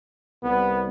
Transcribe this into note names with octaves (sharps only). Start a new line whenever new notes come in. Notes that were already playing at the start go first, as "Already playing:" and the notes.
C2 B3